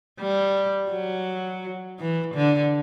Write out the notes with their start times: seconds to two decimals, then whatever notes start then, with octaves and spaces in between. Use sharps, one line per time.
0.19 G3
0.91 F#3
1.99 E3
2.35 D3